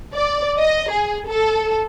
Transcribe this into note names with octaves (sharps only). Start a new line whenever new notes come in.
D5
D#5
G#4
A4